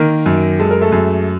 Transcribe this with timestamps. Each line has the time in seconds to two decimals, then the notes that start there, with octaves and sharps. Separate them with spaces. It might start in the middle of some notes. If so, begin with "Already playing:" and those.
Already playing: D#3 A#3 A#4
0.26 F#2
0.60 G#3 A4
0.71 A#4
0.81 A3 A4
0.92 F#2